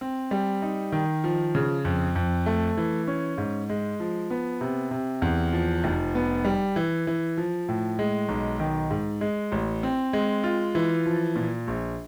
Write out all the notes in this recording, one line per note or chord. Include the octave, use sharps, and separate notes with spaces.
C4
G3
D#4
D#3
F3
C#3
F2
F2
A3
E3
C#4
G#2
G#3
F3
B3
C3
C3
E2
F3
F1
B3
G3
E3
E3
F3
A2
G#3
B1
D#3
G#2
G#3
A1
C4
G#3
F4
E3
F3
A#2
A#1